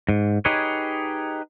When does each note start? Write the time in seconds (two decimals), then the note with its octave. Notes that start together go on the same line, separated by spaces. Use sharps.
0.09 G#2
0.45 D#4 G4 G#4 B4 C#5